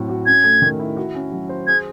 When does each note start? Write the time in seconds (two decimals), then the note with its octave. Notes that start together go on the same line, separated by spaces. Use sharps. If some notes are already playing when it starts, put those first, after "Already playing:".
Already playing: A2 F#3 C4
0.09 F#4
0.26 C#4 G#6
0.44 A3
0.62 D#3
0.79 E4
0.97 F#4
1.15 C#4
1.32 F#3
1.49 C5
1.67 G#4 G#6